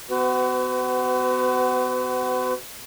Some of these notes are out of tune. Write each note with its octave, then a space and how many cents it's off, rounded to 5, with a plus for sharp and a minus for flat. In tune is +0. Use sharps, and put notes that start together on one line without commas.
B3 +25 F#4 +25 B4 +45